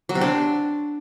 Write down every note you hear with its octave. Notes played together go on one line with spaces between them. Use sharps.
F#3
C3
D4